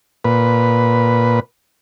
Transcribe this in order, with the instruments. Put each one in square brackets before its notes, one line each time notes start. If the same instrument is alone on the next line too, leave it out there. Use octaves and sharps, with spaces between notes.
[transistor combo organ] A#2 B4